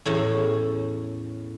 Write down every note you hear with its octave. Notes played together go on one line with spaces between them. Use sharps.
E2 A2 C#4